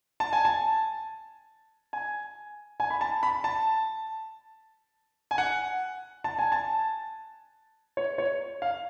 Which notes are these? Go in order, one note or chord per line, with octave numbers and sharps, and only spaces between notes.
A5
G#5
A5
G#5
G#5
B5
A5
B5
A5
G#5
F#5
A5
G#5
A5
C#5
C#5
F5